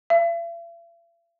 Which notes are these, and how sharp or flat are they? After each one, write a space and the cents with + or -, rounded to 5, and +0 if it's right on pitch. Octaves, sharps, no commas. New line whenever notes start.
E5 +45